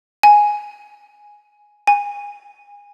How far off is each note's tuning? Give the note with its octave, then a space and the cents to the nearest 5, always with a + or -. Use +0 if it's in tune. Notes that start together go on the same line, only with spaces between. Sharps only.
G#5 +0
G#5 -25